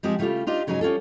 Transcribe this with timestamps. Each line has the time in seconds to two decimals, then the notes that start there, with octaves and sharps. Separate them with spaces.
0.03 F3 G#3 C4 G4 G#4
0.19 C#3 G3 A3 D4 F4 G4
0.47 D4 D#4 F4 G4 C5
0.67 G#2 C#3 F#3 C#4 D#4 G#5
0.81 G3 C#4 F4 A4